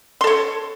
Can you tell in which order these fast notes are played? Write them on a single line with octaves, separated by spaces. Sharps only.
C6 A4 C#5